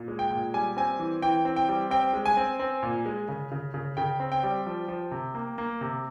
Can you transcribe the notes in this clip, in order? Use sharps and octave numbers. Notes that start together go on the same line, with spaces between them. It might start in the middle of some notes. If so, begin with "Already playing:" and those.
Already playing: A#2
G#3
G5
A#2
G3 G#5
C4 G#5
E3
E3 G5
C4
G5
G3
C4 G5
G#3
G#5
C4
C4
A#2
G#3
C#3
C#3
C#3
C#3 G5
C4
G5
G3
F3
F3
C3
A#3
A#3
C3